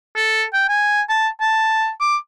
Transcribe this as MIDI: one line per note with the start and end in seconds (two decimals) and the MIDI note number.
0.16 0.44 69
0.53 0.64 79
0.69 1.02 80
1.09 1.28 81
1.41 1.89 81
2.01 2.17 86